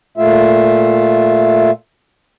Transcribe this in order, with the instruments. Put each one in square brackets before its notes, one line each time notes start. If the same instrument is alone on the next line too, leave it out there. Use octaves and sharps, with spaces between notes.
[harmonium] A#2 A3 F4 E5